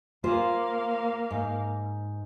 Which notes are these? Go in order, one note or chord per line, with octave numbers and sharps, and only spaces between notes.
A#3 F4 G#4 C5 F5
G#2